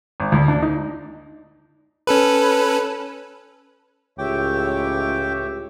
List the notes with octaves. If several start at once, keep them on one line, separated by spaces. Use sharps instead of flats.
G#1
D2
D4
D#4
C#4 A4 B4
C#2 A2 G4 C#5 E5 G5 D6